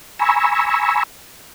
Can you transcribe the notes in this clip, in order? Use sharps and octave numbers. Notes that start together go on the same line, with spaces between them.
G#5 A#5 B5 C#6 E6